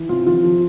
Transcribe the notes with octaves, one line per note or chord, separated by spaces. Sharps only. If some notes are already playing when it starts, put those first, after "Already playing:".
Already playing: E3
C3 F4
F3 F4
F3